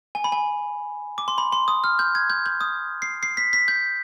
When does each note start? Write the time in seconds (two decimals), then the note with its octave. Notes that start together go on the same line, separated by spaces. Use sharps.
0.15 G#5
0.24 B5
0.32 G#5
1.18 D6
1.28 C6
1.38 B5
1.52 C6
1.68 D#6
1.84 F6
1.99 G6
2.15 G#6
2.30 G6
2.46 G6
2.61 D#6
3.02 C7
3.23 C7
3.37 B6
3.53 B6
3.68 G6